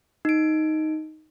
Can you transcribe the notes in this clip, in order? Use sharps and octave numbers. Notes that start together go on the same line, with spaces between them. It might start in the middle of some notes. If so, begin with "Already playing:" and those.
D#4 D7